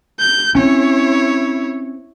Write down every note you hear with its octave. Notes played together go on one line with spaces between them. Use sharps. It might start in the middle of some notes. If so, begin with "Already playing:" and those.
G6
C4 C#4 E4 C#5